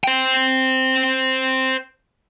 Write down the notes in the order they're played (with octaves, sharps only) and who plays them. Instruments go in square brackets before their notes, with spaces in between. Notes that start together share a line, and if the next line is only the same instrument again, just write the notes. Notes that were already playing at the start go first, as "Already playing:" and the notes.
[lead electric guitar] C5 G5